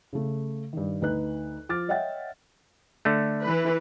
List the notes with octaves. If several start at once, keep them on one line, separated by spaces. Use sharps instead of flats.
C#3 A3
G2 D#3
D2 D#4 B4 F#6
F3 D6 F6 A6
C#5 D#5 E5 F#5 G5 A6
D3 A3
E3 B4